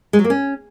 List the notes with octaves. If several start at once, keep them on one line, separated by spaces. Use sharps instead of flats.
G#3
F#3
A#3
C#4